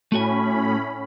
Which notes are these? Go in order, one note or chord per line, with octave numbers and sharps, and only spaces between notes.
A2 A3 C#4 F#4 G#5 B5